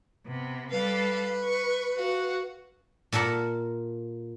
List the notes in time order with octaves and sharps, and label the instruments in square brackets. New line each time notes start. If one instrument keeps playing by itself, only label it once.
[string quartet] C3 B3
[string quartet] G3 A4 F5 [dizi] B4
[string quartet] C#6
F#4 F5 F#5
[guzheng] A#2 A4 A#4 F#5 A5